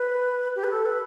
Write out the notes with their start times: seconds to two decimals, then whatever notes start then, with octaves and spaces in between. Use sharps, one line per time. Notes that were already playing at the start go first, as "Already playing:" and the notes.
Already playing: B4
0.56 G4
0.64 B4
0.71 A4
0.86 B4